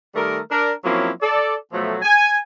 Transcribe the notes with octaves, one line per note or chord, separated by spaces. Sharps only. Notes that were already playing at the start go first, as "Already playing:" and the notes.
D#3 G3 A3 A#4
D4 A#4
F3 F#3 A#3 C4 C#4 E4
A4 D5
B2 F3 F#3 A3
G#5